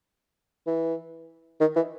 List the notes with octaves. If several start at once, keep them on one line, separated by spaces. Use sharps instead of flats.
E3
D#3
E3